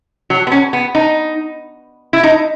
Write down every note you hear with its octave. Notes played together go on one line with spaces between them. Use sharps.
F#3
B3
C#4
B3
D#4
E4
D#4